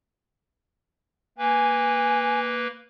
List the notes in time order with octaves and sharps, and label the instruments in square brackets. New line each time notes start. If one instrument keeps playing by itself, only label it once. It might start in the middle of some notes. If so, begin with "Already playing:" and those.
[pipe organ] A#3 B4 [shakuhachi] G#5